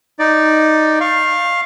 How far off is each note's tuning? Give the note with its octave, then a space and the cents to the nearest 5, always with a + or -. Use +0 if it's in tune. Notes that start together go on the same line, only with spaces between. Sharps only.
D#4 +0 D5 +10
F5 +0 C#6 -35